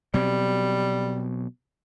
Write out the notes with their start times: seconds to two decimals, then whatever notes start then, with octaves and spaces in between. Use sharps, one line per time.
0.14 B2 F#3 G3 C4